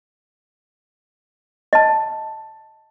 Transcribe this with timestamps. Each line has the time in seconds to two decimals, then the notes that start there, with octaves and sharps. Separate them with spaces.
1.73 D#5 A5